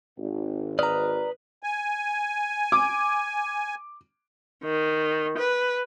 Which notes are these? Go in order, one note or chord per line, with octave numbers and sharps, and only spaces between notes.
G#1
B4 D5 A#5 D#6 F6
G#5
D6
D#3
B4